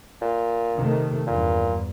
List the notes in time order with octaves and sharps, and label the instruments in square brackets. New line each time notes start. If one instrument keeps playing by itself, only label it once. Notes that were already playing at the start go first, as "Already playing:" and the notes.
[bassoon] A#2
[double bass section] C3 D#3 A3
[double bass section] E2 G2 [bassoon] A#2